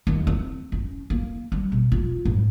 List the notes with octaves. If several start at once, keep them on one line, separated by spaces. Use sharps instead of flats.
D#2
C4
C#4
A#3
G3
B2
F4
G#2